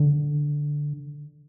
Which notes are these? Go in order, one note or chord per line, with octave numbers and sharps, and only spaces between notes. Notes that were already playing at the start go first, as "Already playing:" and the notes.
Already playing: D3